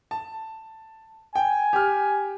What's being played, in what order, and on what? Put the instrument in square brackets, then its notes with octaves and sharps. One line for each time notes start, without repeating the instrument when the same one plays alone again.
[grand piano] A5
[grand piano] G5 [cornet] G#5
[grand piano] G4 F6